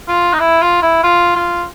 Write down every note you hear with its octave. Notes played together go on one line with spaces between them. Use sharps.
F4
D#4
E4
F4
E4
F4
F4